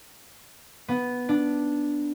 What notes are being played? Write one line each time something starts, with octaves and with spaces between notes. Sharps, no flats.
B3
D4